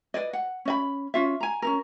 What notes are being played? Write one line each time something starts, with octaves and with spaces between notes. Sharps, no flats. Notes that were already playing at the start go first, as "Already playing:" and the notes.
B4 C5 D5 D#5
F#5
C#4 D#5 B5
C#4 F4 E5
G#5 A#5
C#4 D#4 A#4